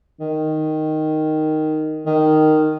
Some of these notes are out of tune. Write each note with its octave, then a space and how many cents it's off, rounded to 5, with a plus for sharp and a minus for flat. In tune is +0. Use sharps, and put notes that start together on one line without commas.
D#3 -5
D#3 -5